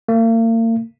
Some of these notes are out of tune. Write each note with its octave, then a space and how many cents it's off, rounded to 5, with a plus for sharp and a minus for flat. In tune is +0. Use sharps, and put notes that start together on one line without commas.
A#3 -40